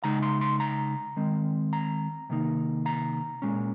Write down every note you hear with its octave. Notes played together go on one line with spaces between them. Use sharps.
C#3 G#3 D#4 A#5
C6
C6
A#5
D#3 G#3 C4
A#5
C3 D#3 A#3 D#4
A#5
A#2 G#3 C#4